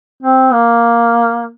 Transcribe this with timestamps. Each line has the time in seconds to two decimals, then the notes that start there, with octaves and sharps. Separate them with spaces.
0.23 C4
0.53 A#3